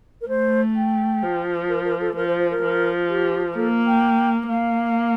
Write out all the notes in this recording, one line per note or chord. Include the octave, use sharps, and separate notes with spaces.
A#4
A3 C5
G5
F3
A#4
A#4
A4
F3 A#4
C5
C5
A#4
F3
G4
A#3 A4
G5
A#3 F5